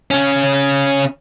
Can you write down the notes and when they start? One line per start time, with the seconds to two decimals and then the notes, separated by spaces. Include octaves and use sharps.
0.11 C#3 C#4